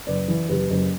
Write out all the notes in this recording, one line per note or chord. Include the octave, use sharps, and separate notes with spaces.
F#1 B4 D5
E3
F#1 G4 B4
F#1